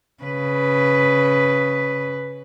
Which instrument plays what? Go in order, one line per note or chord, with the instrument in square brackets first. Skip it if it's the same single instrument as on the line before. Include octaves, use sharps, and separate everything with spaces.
[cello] C#3 B4